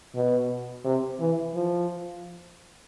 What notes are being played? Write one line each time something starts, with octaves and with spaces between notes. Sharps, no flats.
B2
C3
E3
F3